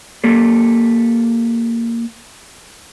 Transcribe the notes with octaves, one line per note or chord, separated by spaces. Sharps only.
A#3 G4 A4